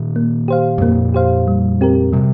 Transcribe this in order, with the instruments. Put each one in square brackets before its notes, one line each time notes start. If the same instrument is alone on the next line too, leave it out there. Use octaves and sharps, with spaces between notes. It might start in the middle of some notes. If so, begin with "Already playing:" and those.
Already playing: [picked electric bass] A#2 D#3
[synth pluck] A#3
G4 C5 F5
[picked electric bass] G2
[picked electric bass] F2 A#2 [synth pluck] A#3
[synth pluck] G4 C5 F5
G3
C4 G4 A#4
[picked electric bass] C3 [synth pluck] G3